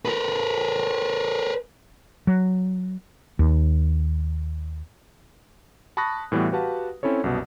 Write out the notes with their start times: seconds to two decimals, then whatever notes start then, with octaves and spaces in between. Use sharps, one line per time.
0.05 A#4 B4
2.27 F#3
3.39 D#2
5.97 A5 B5 C#6 D#6 F#6 A#6
6.32 A2 E3 G3 B3 F#4
6.52 F#4 G4 B4 F5 F#5 A5
7.03 C4 C#4 E4 A4 C#5
7.24 C2 F#2 B2